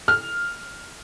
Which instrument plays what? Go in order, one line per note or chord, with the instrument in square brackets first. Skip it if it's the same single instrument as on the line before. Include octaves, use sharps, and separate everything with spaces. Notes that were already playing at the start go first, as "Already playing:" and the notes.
[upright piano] F6